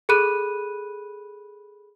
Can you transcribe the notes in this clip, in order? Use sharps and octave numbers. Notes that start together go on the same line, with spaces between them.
G#4 A4 B5 F#6 D#7